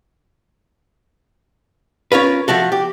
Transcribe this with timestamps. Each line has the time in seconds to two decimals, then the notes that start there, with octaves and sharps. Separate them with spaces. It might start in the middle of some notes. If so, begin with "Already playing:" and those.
2.12 C#4 F4 A#4 B4
2.48 F3 A3 F#4 A4
2.72 G4